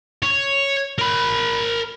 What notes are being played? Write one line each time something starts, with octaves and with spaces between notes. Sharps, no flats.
C#5
A#4 B5